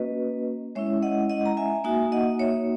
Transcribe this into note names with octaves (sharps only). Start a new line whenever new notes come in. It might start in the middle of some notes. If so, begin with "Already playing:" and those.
Already playing: A#3 C#4 F#4 B4 D#5
G#3 C#4 E4 C#5 E5
D#5 F#5
D#5 F#5
A#5
E5 G#5
A#3 D#4 F#4 E5 G#5
D#5 F#5
C#5 E5